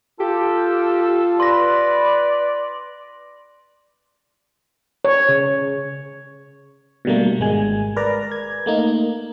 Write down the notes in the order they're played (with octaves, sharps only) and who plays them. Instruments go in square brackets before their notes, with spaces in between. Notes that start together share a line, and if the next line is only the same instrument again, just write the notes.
[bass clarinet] F4 [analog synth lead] G4 [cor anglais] A4
[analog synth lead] B4 [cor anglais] D5 [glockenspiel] C6 A#6
[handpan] C#5
C#3
[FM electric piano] B2 D3 G3 A3 A#3
G#1 G#3 G#5
A#4 B4 D5 A#5
G#6
A3 A#3 D#4